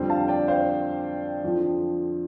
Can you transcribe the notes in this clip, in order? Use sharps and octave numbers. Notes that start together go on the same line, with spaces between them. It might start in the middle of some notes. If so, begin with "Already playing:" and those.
Already playing: F2 D3 G3 C4
F5 A5
D5 G5
C5 F5
F2 D3 F3